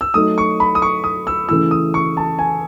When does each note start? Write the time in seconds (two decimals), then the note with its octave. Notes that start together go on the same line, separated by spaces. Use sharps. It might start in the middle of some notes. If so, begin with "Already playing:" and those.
0.01 E6
0.14 F#3 A3 D#4 D#6
0.38 C#6
0.60 B5
0.75 D#6
0.82 C#6
1.04 D#6
1.27 E6
1.49 C#3 E3 A3 E4 E6
1.71 D#6
1.94 C#6
2.17 A5
2.39 G#5